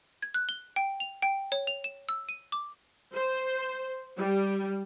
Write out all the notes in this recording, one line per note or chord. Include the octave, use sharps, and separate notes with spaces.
G#6
F#6
G7
G5
F7
G5
C#5
F7
E7
E6
D#7
D6
C5
G3